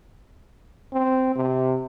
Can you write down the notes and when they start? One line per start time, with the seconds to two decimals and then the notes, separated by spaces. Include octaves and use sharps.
0.93 C4
1.36 C3